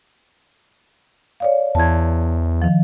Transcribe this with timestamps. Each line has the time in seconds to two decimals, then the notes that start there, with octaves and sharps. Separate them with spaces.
1.40 C#5 D5 F5
1.75 E2 A5 G#6
2.62 D#3 F3